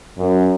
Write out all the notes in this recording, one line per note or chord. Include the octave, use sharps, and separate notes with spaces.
F#2